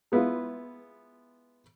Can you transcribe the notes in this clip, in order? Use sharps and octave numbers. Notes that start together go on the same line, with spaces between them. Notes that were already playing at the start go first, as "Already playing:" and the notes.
G#3 B3 E4 F4